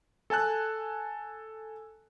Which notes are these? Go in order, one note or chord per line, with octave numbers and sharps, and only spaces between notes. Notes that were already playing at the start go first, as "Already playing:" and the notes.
A4 G#5 A5 F#6